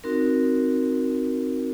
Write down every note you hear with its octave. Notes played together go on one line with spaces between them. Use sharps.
C4 D#4 F#4 A#4